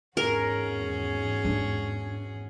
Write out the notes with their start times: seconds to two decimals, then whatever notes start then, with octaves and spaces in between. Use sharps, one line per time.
0.17 G#1 E2 G#2 C#4 F#4 G#4 A#4
1.45 D4